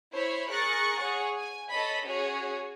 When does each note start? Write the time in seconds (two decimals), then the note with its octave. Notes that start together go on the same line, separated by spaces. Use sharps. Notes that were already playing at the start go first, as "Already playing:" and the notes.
0.13 E4 C5 C#5 B5
0.51 G#4 A#4 C#6 F#6 A6 A#6
0.99 G#4 C#5 F#5 C#6
1.38 G#5
1.71 A4 C#5 D#5 B5
2.06 C#4 F#4 G#4 C#5